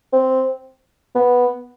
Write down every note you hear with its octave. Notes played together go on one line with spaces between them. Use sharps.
C4
B3